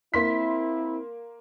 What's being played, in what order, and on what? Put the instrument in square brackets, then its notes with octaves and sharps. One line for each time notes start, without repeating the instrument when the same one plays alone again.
[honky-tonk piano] A#3 C6 B6 [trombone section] C4 E4